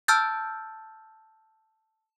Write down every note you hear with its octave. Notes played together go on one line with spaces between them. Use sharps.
A5 E6 F6 G6 A6